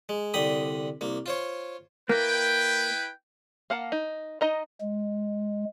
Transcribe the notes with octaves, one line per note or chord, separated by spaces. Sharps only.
G#3
C2 D3 G5 B5 D#6
C2 A#3
F4 C5 C#5
A#3 E4 B4 G5
A#3 F5 F#5 A5
D#4
D#4 D#5 A#5
G#3